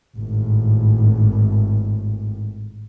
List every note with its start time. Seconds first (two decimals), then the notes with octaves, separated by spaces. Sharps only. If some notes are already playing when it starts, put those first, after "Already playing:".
0.18 G#1 A2